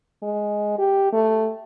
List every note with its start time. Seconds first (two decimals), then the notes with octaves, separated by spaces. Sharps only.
0.23 G#3
0.78 G4
1.13 A3